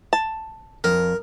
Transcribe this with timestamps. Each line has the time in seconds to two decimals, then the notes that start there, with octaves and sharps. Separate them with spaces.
0.13 A5
0.84 F2 A#4